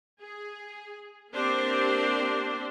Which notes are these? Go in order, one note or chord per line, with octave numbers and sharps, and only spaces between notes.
G#4
A#3 C4 D4 G4 C5